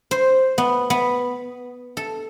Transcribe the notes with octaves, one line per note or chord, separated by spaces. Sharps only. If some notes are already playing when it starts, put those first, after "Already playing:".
C5
B3
B3
A4